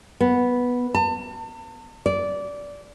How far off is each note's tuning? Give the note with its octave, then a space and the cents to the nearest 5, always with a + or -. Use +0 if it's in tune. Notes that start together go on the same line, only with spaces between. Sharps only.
B3 -5
A5 +40
D5 -15